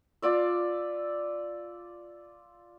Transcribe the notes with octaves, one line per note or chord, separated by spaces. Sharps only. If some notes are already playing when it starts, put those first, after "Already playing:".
F4 D5 E5